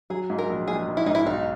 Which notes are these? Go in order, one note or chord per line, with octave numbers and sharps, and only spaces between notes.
F#3 G#4
G#2
A#4
A#1
A#1 G#4
A#1
E4
G#2 D#4
E4
B1 D#4